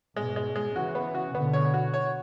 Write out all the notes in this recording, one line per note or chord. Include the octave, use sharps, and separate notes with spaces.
G#2 B2 G#3
G#3
G#3
C#3 E3 F#4
B3
F#4
B2 D3 B3
C#5
F#4
C#5